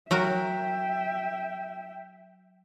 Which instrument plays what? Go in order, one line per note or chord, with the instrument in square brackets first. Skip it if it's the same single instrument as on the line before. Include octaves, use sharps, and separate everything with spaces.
[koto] F#3 F#4 A#4 [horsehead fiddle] E5 G5